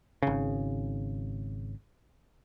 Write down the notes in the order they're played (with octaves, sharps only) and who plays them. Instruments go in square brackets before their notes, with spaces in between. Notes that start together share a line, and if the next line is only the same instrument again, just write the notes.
[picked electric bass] G#1 C#3